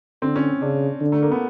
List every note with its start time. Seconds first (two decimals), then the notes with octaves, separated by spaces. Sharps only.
0.22 D3 C4
0.36 C#4
0.62 C#3 D4
1.01 D3
1.12 A3
1.22 A#3
1.32 B3